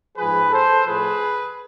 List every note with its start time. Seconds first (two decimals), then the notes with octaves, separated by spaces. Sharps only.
0.17 G#2 F3 G#4 B4
0.52 A4 C5
0.86 A2 F3 G#4 B4